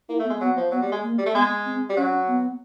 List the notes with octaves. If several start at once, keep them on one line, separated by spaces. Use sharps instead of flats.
A#3 E4
A3
B3
G#3
F#3 B3
F3
F#3 B3
G3
G#3
A#3
G3
A3
G#3 B3
C4
G3
F#3 C#4
B3